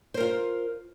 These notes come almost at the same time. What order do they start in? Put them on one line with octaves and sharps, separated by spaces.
C5 A#4 F4